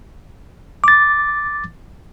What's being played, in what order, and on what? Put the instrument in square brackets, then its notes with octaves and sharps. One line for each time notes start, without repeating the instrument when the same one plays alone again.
[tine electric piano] D6 A6